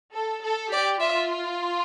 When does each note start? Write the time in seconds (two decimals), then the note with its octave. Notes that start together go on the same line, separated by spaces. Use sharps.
0.13 A4
0.43 A4
0.72 G4 D5
1.01 F4 E5